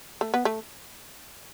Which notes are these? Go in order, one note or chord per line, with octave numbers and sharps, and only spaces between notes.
A3
B3
A3